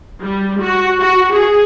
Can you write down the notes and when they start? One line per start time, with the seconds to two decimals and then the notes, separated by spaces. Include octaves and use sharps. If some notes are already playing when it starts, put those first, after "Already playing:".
0.22 G3
0.62 F#4
1.01 F#4
1.33 G#4